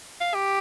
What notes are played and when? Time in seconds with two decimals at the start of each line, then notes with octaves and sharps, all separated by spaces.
0.21 F5
0.35 G4